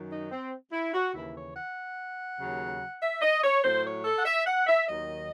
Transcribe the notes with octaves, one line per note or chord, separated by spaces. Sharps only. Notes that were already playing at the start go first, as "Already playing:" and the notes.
Already playing: F#2 D#3 F#3
D#4
C4
E4
F#4
D#2 C#3 E3 E4
C#5
F#5
D#2 C#3 F#3
E5
D#5
C#5
A2 F#3 C5
C#5
A4
F#5
E5
F#5
E5
D#2 D#3 F#3 D#5